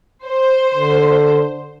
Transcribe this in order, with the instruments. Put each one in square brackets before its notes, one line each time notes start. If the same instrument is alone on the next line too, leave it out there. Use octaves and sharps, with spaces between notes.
[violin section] C5
[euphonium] D3